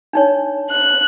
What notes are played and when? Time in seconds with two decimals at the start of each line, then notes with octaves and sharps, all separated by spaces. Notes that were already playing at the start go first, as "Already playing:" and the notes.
0.13 D4 D#4 C#5
0.70 F#6